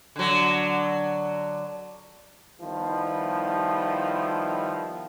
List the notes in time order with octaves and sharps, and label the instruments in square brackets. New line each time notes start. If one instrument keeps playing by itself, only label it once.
[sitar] D3 F#3
[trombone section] D#3 F3 G3 B3 E4